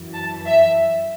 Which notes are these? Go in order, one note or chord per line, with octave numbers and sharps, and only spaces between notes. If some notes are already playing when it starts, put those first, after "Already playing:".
Already playing: F#2 E3
A5
E5